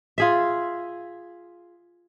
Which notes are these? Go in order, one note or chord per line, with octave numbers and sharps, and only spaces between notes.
F4 G#4 E5